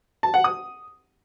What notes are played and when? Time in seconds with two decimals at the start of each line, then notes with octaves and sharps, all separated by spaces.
0.23 A5
0.34 F#5
0.44 D#6